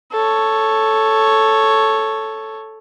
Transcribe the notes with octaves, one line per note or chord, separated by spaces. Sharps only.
A4 C#5